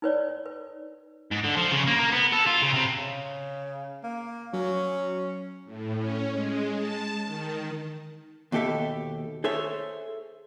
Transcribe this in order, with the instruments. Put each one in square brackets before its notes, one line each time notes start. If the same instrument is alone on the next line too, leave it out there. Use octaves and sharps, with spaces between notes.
[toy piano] D#4 B4 C#5 D5
B4
[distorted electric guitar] G#2
D3
F3
C#3
A#3
A#3
B3
A4
F4
C#3
C3
[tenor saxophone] C#3
A#3
[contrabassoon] F#3 [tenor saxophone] C#4
[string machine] A2
C#4
G#3
A5
D#3
[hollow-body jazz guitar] D#2 B2 G4 A4 E5 F5
G#4 A4 C5 C#5 E5